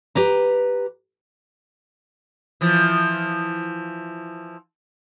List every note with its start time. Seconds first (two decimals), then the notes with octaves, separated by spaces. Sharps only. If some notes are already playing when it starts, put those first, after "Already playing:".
0.15 G4 B4 A#5
2.61 E3 F3